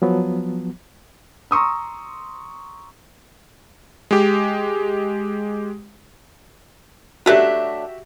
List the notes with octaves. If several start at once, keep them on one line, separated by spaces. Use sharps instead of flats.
F3 F#3 B3
A#5 C6 C#6 D#6 E6
G#3 G4
F#3 A3 D4 F#4 G4 E5